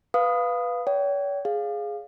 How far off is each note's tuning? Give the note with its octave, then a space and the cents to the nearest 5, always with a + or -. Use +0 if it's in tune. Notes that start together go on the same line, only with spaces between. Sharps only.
B4 +0 F5 +0 D#6 -10
C#5 +40 G5 -25
G#4 +0 F5 +0